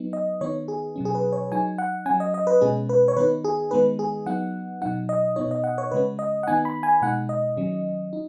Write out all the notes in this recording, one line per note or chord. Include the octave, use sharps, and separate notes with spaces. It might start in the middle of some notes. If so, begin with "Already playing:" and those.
Already playing: F#3 B3 D#4
D#5
D#3 B3 D#4 C#5
G#4
B2 F#3 C#4
G#4
B4
C#5
F#3 D#4 G#5
F#5
F#3 C#4 G#5
D#5
D#5
B4
B2 G#3 C#4 G#4
B4
C#5
D#3 B3 D#4 B4
G#4
D#3 G#3 B3 D#4 B4
G#4
F#3 B3 D#4 F#5
B2 F#3 D#4 F#5
D#5
B2 B3 D#4 C#5
D#5
F#5
C#5
C#3 G#3 C#4 B4
D#5
F#5
D#3 B3 D#4 G#5
B5
G#5
B2 G#3 D#4 F#5
D#5
D#3 F#3 C#4
D#4